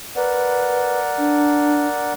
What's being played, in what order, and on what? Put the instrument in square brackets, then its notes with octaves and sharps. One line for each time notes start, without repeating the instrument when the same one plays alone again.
[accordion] A#4 D5 F#5 [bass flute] B4
[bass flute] D4